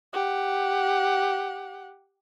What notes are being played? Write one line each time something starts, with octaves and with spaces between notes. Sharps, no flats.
G4 F#5